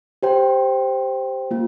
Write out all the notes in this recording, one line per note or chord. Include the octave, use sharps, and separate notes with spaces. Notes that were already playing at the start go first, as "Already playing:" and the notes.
G4 C5 G5
A#3 F4